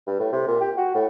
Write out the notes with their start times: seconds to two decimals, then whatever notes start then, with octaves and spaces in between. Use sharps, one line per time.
0.07 G2
0.19 A2
0.32 C3
0.47 A#2
0.61 G4
0.77 F#4
0.95 A2